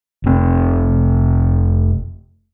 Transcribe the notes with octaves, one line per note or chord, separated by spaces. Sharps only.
F1 C4